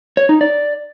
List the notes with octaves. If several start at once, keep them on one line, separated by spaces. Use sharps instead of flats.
C#5
D#4
D5